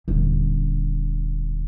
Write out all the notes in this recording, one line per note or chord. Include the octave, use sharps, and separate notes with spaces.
D#1 D3